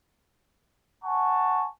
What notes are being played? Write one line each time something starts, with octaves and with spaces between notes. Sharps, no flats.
F#5 G#5 A5 C#6